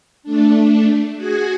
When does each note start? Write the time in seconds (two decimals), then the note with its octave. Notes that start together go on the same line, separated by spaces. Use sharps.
0.23 A3 D4
1.16 F#4 G#4 G#5